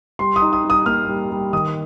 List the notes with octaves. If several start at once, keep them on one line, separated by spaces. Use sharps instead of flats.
G3 C6
D#6
D#4
D#6
G3
D#6
A#3 F6
G3
G3
D#3 D#6